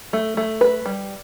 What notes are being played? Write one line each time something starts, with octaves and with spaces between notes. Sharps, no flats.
A3
A3
B4
G3